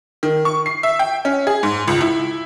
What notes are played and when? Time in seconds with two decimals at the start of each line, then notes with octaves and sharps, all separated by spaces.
0.23 D#3
0.45 C#6
0.66 C7
0.83 E5
0.99 G5
1.25 C#4
1.47 G#4
1.63 G#2
1.88 C#2
2.01 E4